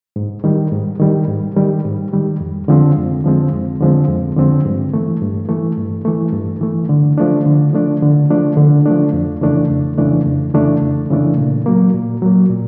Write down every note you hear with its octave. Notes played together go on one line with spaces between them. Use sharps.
G#2
D#3 G3
G#2
D#3 G3
G#2
D#3 G3
G#2
D#3 G3
F2
D3 F3 G#3 C4
F2
D3 F3 G#3 C4
F2
D3 F3 G#3 C4
F2
D3 F3 G#3 C4
G2
E3 A3
G2
E3 A3
G2
E3 A3
G2
E3 A3
D3
F3 A3 D4
D3
F3 A3 D4
D3
F3 A3 D4
D3
F3 A3 D4
F2
C#3 E3 A3 D4
F2
C#3 E3 A3 D4
F2
C#3 E3 A3 D4
F2
C#3 E3 A3 D4
A#2
F#3 A#3
A#2
F#3 A#3
A#2